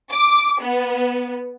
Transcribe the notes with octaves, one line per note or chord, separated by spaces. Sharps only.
D6
B3